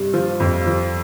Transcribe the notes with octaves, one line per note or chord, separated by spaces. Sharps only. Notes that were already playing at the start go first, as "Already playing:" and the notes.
Already playing: G2 C3
F3
F2
F3